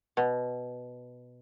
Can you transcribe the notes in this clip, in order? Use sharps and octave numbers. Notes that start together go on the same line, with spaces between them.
B2